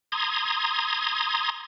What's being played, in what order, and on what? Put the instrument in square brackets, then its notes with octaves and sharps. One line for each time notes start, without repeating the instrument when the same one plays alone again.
[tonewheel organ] A#5 C6 D#6 G#6